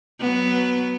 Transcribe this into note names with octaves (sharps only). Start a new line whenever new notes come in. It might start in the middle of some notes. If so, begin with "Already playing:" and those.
F#3 B3